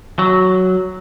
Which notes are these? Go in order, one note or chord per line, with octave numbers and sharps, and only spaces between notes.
F#3